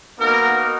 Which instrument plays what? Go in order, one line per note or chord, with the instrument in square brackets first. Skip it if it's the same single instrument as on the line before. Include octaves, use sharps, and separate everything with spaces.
[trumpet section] A#3 B3 D#4 F#4 A#4